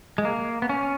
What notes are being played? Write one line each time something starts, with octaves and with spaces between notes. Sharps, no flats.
G#3
A#3
B3
C#4